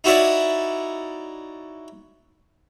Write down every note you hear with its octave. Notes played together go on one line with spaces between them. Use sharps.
D#4 E4 F#4 C#5 D5 E5